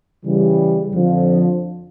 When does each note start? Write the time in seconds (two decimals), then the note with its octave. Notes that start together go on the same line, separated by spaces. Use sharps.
0.24 C#3 E3 G3
0.93 F2 D3 F3